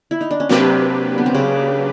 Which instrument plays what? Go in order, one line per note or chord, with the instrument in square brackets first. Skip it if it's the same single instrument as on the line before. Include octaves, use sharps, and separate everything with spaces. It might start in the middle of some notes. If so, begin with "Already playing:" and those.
[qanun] E4
D#4
D4
C#4
[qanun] C3 C4 [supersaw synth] F#3 A#3 D4 G4 B4
[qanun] B3
C4
C#3 C#4